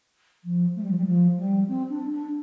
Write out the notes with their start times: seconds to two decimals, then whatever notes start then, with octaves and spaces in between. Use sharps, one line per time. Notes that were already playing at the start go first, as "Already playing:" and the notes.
0.44 F3
0.76 A3
0.82 G3
0.90 F3
0.98 G3
1.06 F3
1.37 G3
1.68 C4
1.89 D4
2.10 D4